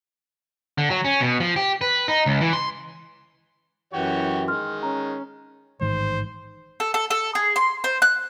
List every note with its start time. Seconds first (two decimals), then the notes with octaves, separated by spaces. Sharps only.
0.78 D3
0.90 F#3
1.05 C#4
1.21 B2
1.40 F3
1.56 G4
1.81 B4
2.08 D#4
2.26 C#2
2.41 E3
2.53 C6
3.93 F#2 E3 F#4 G4 C#5
4.48 D#3 G#3 C6 F6
4.83 C#4 A#5
5.81 A1 G#2 D#3 C5
6.80 A4
6.94 A4
7.10 A4
7.35 G#4
7.56 C6
7.84 C5
8.02 F#6